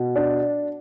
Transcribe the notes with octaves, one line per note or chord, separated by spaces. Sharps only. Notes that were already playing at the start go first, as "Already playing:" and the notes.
Already playing: B2
D4